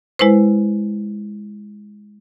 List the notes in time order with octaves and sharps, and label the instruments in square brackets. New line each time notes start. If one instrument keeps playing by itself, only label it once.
[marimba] G#3 E4 B4 C5